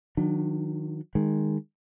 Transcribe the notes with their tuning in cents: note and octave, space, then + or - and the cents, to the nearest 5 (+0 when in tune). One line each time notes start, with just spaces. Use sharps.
D#3 +0 F#3 -30 D4 +25
D#3 -5 G#3 -10